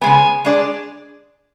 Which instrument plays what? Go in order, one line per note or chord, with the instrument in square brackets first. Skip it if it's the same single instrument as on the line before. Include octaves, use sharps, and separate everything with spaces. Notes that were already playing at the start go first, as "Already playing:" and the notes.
[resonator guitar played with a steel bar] C#3 G#3 B3 [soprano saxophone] G#5
[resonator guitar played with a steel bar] G#3 D4 G#4 D5